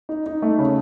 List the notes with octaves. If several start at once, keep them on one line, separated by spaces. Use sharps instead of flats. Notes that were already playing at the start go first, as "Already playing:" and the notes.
D#4
D#4
A3
C#3